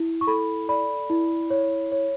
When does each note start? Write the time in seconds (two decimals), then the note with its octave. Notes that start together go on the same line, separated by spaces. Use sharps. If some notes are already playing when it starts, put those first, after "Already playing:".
Already playing: E4
0.21 C#6
0.27 A4 B5
0.69 D5 B5
1.10 E4
1.50 C#5
1.92 C#5